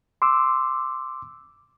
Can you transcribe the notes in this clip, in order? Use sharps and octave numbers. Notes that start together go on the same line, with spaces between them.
C6 D6 E6